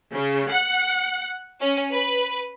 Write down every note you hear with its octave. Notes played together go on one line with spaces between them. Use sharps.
C#3
F#5
C#4
B4